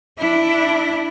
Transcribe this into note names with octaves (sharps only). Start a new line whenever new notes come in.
D4 E4